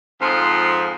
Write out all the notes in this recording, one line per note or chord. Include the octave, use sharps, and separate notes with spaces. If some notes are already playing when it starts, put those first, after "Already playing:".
F2 G#2 F3